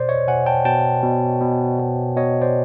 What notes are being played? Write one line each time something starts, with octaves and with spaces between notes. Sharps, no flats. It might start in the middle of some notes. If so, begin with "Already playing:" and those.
Already playing: B2 C5 D5
C#5 D#5
B2 F#5 G#5
G5 A5
B2 G5 A5
B2
B2
B2
B2 C#5 D#5
C5 D5